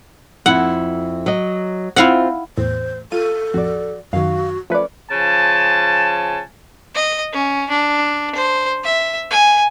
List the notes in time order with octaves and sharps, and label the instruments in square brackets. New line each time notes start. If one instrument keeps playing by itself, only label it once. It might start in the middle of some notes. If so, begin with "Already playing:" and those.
[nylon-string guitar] F2 E4 [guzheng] F#5
[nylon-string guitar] F#3 D#5
[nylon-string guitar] C4 F4 [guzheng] E4 F5 F#5
[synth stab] E2 A2 [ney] C5
[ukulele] F4 [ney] A4 [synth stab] D#7
[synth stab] A1 F2 [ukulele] F#4 D5
[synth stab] F#2 D#3 [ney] F#4 [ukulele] F5
[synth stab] F3 A3 B4 [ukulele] C#4 D5
[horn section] C#3 F3 G#5 A5
[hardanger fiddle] D#5
C#4
D4
C5
E5
G#5